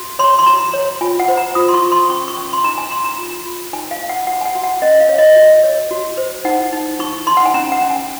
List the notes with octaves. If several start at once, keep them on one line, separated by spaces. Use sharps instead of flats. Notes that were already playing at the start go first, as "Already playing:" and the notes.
Already playing: F#4
C#5 C6
C6
F#4 A#5
C#5
F4 G#5
F#5
C5
A#5
F4 D#6
C6
C#6
F4
C6
C#4 C#6
C#6
C#4
C6
D#4 A#5
G#5
D#4 C6
A#5
F4
F4
D#4 G#5
F5
D#4
F#5
F#4 F#5
G#5
F#5
F#4
F#5
C#4 D#5
F5
C#5
D#5
F#4 D#5
C#5
F#4
C5
D#4 F#5
D#4
D#4 C#6
D#4 C6
F#5
G#5
C#4 A#5
F#5
C#4
G#5